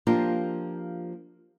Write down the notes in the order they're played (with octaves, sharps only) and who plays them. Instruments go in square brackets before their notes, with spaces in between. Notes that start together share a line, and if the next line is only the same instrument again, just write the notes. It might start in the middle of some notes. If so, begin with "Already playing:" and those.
[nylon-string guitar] F3 A#3 D4 F4 G4 A#4